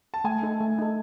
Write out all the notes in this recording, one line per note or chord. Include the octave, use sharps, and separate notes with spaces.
A5
A3 G#5
D#4 A4
A3
D#4 A4